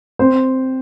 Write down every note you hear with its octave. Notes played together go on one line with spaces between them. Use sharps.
C4 C5